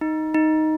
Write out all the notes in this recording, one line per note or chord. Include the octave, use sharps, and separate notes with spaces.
D#4
D#4